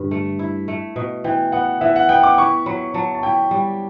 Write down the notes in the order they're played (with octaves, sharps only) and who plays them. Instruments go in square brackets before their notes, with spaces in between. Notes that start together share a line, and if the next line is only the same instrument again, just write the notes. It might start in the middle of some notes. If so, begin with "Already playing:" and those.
Already playing: [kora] G2 D3
A3
E4
A3
B2
[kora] E3 [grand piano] G5
[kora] B3 [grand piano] F#5
[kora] E3 [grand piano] E5
[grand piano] F#5
[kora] B3 [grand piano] G5
[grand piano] D6
[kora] E4 [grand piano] C#6
[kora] F#3 [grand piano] B5
[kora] F#3 [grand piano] A5
[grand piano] A5
[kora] E4 [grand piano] G5
[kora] G3